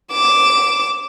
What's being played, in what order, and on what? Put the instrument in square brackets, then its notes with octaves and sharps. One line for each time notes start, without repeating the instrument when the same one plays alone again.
[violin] D6 E7